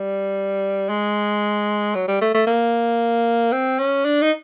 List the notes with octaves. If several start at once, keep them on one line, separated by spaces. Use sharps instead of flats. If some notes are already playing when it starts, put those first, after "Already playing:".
Already playing: G3
G#3
F#3
G3
A3
A3
A#3
C4
C#4
D4
D#4